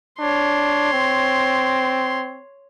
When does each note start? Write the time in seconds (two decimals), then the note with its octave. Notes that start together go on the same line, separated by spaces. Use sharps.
0.19 D4 C#5 C6
0.93 C4